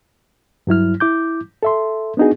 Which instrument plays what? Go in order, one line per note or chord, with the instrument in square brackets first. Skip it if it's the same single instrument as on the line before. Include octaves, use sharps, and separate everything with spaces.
[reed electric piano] G2 F#3 E4 F6
E4 D6 G6
A4 E5 C6
B3 D4 D#4 F#4 G#4